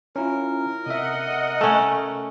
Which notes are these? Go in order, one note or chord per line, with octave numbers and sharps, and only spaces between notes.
C#4 E4 F4 A#4
C3 D#5 E5 F#5
A3 C#4